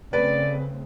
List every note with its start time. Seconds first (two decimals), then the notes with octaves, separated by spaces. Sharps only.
0.13 C#3 A3 C4 B4 D5